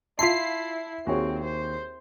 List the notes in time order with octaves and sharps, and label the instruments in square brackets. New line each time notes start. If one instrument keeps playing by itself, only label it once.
[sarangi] E4 [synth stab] F4 C7 [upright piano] A5 B6 [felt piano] C6
[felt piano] D#2 [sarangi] C4 [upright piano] F#4 G#4 C#5
[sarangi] C5